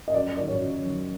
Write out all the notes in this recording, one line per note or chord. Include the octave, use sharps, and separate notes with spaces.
D#5
F#2 D5
D5
D#3 F#3 D5
C#5
F#2
D#3 F#3